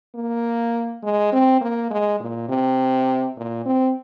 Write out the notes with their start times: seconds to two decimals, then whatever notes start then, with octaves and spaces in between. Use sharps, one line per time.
0.15 A#3
1.03 G#3
1.32 C4
1.61 A#3
1.91 G#3
2.20 A#2
2.49 C3
3.37 A#2
3.65 C4